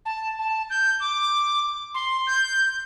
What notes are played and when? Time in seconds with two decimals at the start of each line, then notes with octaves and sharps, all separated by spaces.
0.06 A5
0.39 A5
0.70 G6
1.00 D6
1.94 C6
2.27 G6